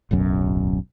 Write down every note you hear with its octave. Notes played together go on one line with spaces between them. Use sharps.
D1 B1 F#2